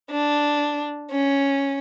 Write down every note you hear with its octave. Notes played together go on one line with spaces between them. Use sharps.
D4
C#4